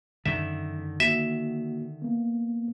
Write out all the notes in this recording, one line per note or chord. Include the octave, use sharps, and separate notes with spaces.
F#2 D3 D#3 E5
A#3 F#4 E5
A#3 B3